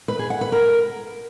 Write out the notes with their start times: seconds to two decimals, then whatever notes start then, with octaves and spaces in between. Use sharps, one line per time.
0.08 B4
0.19 G#4
0.30 F#5
0.41 B4
0.52 A#4